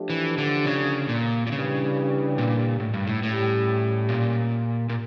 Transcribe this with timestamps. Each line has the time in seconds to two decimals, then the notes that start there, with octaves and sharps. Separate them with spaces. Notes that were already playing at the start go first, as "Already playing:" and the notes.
Already playing: F3 A3 D4 G4
0.10 E3
0.38 D3
0.66 C#3
1.09 A#2
1.47 A#2
1.52 C#3 E3 G3 D4 G4
2.38 A#2
2.80 A2
2.94 G2
3.07 A2
3.23 A2 G3 C#4 G4
4.09 A#2
4.89 A#2